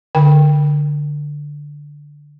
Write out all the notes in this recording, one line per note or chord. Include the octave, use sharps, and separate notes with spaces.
D3 G5